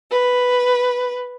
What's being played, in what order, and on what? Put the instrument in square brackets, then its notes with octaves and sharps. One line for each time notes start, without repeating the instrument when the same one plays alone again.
[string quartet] B4